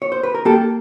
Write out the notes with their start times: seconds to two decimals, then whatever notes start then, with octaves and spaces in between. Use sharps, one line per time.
0.02 C#5
0.12 C5
0.23 B4
0.35 A#4
0.45 A#3 G4 A4